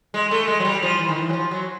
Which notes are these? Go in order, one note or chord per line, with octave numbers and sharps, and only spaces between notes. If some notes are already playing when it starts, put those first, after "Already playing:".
G#3
A3
G#3
F#3
G3
F3
E3
D#3
E3
F#3
F3
F#3